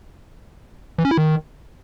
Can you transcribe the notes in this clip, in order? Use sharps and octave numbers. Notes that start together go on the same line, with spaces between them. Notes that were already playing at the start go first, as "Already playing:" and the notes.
E3
C#4
E4
D#3